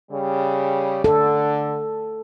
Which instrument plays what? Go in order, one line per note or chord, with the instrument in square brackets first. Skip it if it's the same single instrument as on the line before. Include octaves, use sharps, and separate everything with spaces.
[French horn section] C#3 G3
[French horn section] D3 [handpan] A4